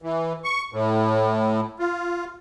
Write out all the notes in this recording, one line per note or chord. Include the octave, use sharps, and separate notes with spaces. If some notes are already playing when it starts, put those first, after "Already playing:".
E3
C#6
A2
F4